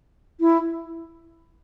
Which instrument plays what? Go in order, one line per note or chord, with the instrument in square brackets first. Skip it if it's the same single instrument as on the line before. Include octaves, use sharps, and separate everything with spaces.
[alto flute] E4